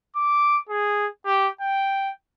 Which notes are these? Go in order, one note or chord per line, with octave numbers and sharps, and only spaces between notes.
D6
G#4
G4
G5